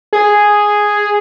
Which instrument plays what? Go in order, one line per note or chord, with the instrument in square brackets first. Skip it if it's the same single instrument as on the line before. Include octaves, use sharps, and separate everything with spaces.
[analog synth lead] G#4